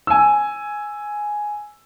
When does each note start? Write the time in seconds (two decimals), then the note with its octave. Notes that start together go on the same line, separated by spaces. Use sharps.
0.07 G#5 E6